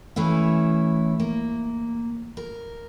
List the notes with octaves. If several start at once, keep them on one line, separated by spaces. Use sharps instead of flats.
E3 A3 C#4 E4
A#3
A#4